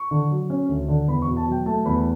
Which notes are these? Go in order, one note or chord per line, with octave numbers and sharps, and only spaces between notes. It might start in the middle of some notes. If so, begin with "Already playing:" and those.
Already playing: C#6
D3
F#3
C#4
D2
D3
E2 B5
C#6
B2
A5
F#3 G5
A3 A5
E2 B5